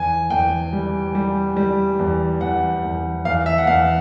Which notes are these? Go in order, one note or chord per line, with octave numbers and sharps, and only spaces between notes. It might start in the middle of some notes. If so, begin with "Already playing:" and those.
Already playing: E2 G#5
E2 G5
G3
G3
G3
E2
E2 F#5
E2
E2 F5
E5
F#5
E2 F5